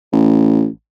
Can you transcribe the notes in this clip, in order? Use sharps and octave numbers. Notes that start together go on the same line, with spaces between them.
A1